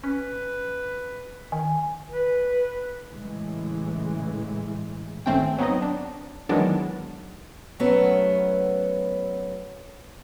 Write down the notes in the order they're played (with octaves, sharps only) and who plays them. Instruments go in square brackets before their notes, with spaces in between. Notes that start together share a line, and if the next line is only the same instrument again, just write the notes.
[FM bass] C#4 [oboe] B4
[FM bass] D#3 [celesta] G#5
[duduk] B4
[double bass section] A2 C#3 E3 G#3
[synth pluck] G#1 A3 C4 C#4 G5
F#3 B3 C4 D#4 D#5
D4
D#3 E3 F#3 G#3 B3 D4
[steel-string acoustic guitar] F#3 A3 B3 C#4